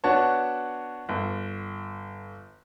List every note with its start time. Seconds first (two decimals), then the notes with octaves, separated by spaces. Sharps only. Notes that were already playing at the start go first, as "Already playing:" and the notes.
0.04 B3 D4 F#4 C#5 A5
1.09 G1